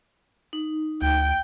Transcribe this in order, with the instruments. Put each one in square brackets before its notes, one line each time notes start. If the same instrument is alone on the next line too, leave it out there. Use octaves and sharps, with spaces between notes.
[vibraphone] D#4
[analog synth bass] D2 [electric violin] G5